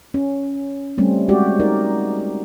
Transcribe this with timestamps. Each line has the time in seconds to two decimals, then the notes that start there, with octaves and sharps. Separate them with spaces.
0.14 C#4
0.98 G3 A3 C4 C#4
1.29 G#3 F#4 G4 D5
1.60 D#4 A#4 D5